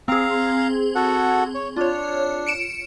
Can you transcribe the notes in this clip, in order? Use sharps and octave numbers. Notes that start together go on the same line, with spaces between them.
C4 G#4 F5 A#5
F#4 A4 F#5
C#5
D4 F4 C#5
C#7 D7 E7